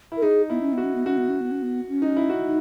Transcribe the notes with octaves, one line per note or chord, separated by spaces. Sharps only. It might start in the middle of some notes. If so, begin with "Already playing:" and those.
E4
A#4
D#4 G#4
B3 E4
C#4
B3 F#4
C#4
B3
C#4 F#4
B3
C#4
B3
C#4
B3
C#4
D#4
E4
F#4
D#4